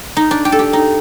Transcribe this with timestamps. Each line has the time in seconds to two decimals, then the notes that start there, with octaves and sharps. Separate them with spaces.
0.17 D#4
0.31 D4
0.45 G4
0.52 A4
0.59 G4
0.73 D#4